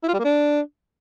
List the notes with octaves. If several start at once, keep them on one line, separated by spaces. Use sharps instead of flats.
E4
F4
G3
A#3
D4